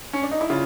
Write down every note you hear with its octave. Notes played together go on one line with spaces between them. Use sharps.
C#4
D4
D#4
E4
C#3 F4